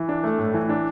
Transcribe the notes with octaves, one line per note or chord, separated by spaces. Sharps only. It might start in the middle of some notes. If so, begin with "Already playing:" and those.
Already playing: E3
D4
A3
A2
E3
D4